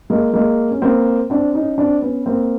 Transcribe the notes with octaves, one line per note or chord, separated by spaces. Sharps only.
G#3 A#3
G#3 A#3
C#4
A#3 C4
C4 D4
C#4 D#4
C4 D4
B3 C#4
A#3 C4